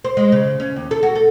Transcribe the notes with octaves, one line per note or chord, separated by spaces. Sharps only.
C5
G#3
C#3
C#4
D#2
A4
F#4
A4